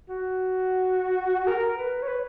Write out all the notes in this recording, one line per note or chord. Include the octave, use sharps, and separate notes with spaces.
F#4
A#4
B4
C#5
B4